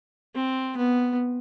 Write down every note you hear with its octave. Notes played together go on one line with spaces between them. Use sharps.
C4
B3